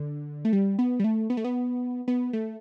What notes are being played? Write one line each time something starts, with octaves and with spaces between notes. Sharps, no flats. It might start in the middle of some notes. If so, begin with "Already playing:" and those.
Already playing: D3
A3
G3
B3
G3
A3
B3
A3
B3
B3
A3